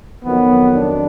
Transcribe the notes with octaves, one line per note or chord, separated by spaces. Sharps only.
F2 D#3 F#3 B3
D4